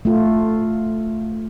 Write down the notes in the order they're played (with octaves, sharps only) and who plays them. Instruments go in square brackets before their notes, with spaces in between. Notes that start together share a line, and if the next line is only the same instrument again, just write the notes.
[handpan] A3 F4